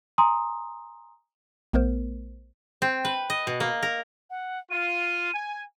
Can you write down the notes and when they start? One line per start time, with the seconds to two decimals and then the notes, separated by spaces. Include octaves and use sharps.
0.18 G#5 A#5 C6 D#6
1.73 A#1 A3 B3 A#4 C5
2.82 C4
3.05 B4
3.30 D#5
3.47 B2
3.60 A#3
3.83 A#4
4.30 F#5
4.71 F4 D#7
5.33 G#5